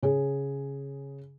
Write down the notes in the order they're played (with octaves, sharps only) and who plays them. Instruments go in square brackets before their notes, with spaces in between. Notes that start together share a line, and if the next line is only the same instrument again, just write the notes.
[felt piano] C#3 G#4